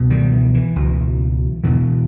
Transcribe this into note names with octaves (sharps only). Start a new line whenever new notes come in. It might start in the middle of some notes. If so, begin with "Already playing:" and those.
Already playing: C#2 B2
D#3 G3
E3
E3
C#2 B2
E2 B2 E3